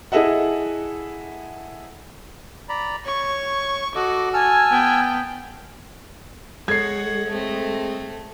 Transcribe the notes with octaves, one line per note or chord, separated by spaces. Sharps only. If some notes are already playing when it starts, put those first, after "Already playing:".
E4 G#4 A4 D#5 E5 F#5
D5 A#5 B5
C#5 C#6
F#4 A4 D#5 D6
G#5 A5 E6 F6
B3 G5
G#3 A4 C#5 F#5 G#6 C7
A3 C4